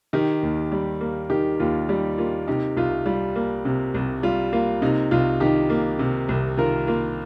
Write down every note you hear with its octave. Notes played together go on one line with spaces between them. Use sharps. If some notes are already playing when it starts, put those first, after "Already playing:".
D#3 D#4 G4
D#2
G3
A#3
D#3 D#4 G4
D#2 F4
G3 D#4 G4
A#3 F4
C3 D#4 G4
C2 F4
G3 F4
A#3
C3
C2
G3 F4
A#3 F4
C3 D#4
C2 F4
D#3 D#4 G4
A#3
C3
C2
D#3 F4 A#4
A#3 F4